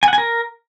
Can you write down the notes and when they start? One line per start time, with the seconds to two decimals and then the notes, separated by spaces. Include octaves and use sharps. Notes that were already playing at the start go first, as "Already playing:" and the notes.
0.03 G#5
0.08 F#5
0.13 G#5
0.18 A#4